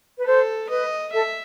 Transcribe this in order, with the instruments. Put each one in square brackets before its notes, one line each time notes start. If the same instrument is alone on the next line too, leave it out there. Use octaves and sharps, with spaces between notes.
[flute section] B4
[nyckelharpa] A4 [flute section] C5
[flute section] B4 [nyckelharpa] D#5
[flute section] A4 [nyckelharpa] E5